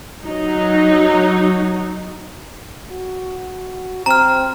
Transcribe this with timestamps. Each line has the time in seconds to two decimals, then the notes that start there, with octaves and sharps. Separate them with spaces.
0.25 F#3 D#4
2.92 F#4
4.06 C4 A#5 F6